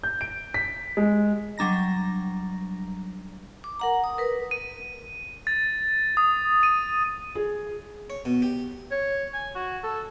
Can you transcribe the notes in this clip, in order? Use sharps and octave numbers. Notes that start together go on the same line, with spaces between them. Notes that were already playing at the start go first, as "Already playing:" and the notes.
G6
D7
B6
G#3
F#3 G3 D4 A#5 A#6
D6
A#4 F#5 A#5
D#6
A#4 B4
D#7
A6
D#6
D#7
G#4
C#5
B2
G4
C#5
G#5
F#4
A4